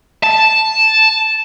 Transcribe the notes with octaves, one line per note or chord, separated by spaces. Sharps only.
A5